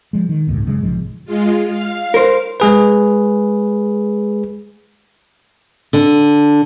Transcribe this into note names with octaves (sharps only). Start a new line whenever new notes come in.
F3 G#3
D#3
G1 C#2 A2
F#2 C#3 G#3
B1 G#2 F3 G#3
G#3 F4
F5
A#4 C5
G#3 G#4 B4
D3